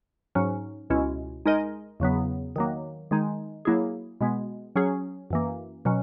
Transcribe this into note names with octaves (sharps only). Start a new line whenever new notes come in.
G#2 F#3 C#4
C#2 B2 G#3 C#4 E4
G#3 D#4 A#4 D#5
E2 C#3 F#3 B3
D#3 F#3 A#3
D#3 G#3 D#4
F#3 A#3 E4 G#4
B2 G#3 B3
F#3 C#4 G#4
F#2 E3 A#3
B2 F#3 C#4